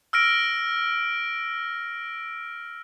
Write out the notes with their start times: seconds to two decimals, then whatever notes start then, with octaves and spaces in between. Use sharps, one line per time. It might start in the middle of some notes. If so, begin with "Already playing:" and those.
0.13 E6 F6 A#6 D7